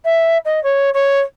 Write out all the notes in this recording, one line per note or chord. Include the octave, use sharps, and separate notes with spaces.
E5
D#5
C#5
C#5